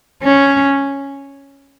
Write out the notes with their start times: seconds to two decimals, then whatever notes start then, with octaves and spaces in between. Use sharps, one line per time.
0.23 C#4